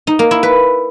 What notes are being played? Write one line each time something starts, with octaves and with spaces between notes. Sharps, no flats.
D#4
A#3
E4
B4